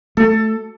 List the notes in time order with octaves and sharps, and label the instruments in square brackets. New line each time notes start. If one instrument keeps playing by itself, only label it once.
[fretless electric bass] A3 [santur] A4